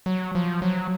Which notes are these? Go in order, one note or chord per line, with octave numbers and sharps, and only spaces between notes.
F#3
F3
F#3